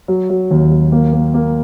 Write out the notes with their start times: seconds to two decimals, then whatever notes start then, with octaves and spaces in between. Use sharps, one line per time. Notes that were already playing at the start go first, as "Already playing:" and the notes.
0.08 F#3
0.30 F#3
0.51 D#2
0.71 F#3
0.92 A#3
1.13 A#3
1.34 A#3